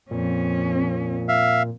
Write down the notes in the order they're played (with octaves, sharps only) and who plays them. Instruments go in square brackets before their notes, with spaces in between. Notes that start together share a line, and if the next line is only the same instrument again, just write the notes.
[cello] F2 C#4 [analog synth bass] A#2
[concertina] E5 F5